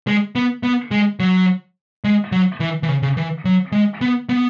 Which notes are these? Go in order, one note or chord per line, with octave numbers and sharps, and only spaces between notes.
G#3
B3
B3
G#3
F#3
G#3
F#3
E3
E3
C#3
C#3
E3
F#3
G#3
B3
B3